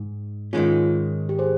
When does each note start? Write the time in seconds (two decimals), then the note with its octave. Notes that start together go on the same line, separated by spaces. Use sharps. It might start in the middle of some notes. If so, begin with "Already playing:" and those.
Already playing: G#2
0.53 G#2 D#3 G#3 C#4 F4
1.29 G4
1.39 G#4 C5